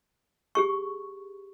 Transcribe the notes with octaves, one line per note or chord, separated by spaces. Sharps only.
G4 G#4 C#6